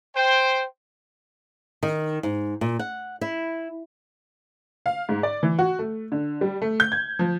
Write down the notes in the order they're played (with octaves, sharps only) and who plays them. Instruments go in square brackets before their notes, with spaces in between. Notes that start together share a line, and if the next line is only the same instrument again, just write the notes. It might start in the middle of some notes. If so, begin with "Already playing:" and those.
[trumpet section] C5 G5
[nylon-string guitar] D#3
G#2
A#2
F#5
E4
[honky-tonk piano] F5
G#2
D5
E3
F#4
A3
D3
G3
A3
G6
G#6
F3